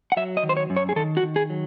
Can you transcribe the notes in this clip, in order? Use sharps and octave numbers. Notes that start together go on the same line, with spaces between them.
F#5
F#3 E5
D#5
D#3
C5
C#5
F#2
C#5
G#4
D#3 A4
F#4
D#3
G#4
F#3